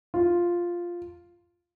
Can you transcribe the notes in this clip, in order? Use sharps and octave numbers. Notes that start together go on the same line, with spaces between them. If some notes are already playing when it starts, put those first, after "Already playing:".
F4